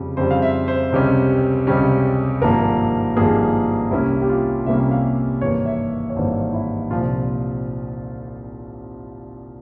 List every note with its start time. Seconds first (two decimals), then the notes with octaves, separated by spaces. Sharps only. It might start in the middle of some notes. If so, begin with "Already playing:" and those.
Already playing: F2 C#3 G3
0.17 F2 C#3 G3 C5
0.31 F5
0.42 E5
0.68 C5
0.92 C#2 C3 G3 C#4
1.67 C#2 C3 G3 C#4
2.42 G#1 G2 F3 A#3 A#4
3.17 G#1 G2 F3 A#3 G#4
3.91 C2 C3 G3 A#3 C#4 E4
4.22 G4
4.29 F4
4.66 C2 C3 G3 A#3 C#4 E5
4.91 F5
5.41 G#1 G2 E3 A#3 C#5
5.66 E5
6.09 C#5
6.16 G#1 G2 E3 A#3 C5
6.53 E4
6.91 C2 A#2 F3 C4 F4